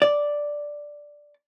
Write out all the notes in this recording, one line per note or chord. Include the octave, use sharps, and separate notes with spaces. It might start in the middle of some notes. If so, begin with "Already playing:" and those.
D5